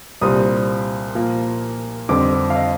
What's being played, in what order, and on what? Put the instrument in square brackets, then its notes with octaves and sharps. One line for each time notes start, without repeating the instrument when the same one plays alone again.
[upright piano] C2 A#2 G3 C4 D#6
A#2 F3 A#3
F2 D3 G3 C4 D6
F5
D#5